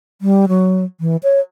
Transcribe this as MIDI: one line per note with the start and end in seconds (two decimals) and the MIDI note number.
0.21 0.45 55
0.48 0.84 54
1.01 1.17 52
1.23 1.40 73